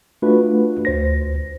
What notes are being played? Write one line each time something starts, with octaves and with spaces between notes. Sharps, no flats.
A3 D4 F4 F#4 B4
D2 C5 A#6